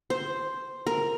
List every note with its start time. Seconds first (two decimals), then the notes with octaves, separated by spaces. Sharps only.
0.10 C5
0.87 A#4